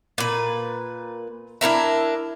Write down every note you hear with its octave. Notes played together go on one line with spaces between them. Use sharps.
A#2 B4
D4 E4 A#4 E5